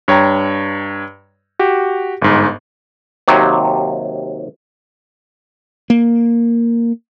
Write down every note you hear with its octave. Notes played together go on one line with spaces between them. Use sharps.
G2 C#5 G5 A#5
F#4 G4
G1 G#2
D#2 C3 F#3
A#3